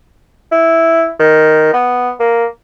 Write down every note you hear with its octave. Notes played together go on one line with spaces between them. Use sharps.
E4
D#3
B3
A#3